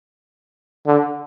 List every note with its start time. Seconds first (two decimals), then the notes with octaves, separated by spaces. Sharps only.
0.87 D3